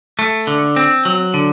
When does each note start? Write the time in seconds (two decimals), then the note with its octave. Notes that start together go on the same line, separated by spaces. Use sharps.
0.19 A3
0.47 D3
0.76 C4
1.05 F#3
1.34 D3